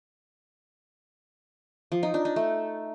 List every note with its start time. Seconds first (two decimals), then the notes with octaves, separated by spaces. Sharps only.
1.92 F3
2.03 D#4
2.14 D4
2.25 D#4
2.36 A3